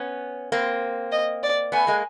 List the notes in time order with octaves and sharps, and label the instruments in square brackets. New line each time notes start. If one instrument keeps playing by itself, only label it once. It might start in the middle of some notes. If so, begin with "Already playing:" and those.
Already playing: [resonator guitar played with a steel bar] B3 C#4
A#3 C4
[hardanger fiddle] D#5
D5
[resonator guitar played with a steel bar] A3 B3 [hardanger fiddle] G#5
[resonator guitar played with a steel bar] G#3 A#3